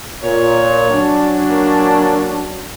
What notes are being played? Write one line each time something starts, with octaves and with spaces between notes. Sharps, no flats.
A#2 C#5
F#3 C#4 D4
A#3